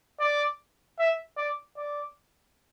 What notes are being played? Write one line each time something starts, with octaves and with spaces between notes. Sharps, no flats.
D5
E5
D5
D5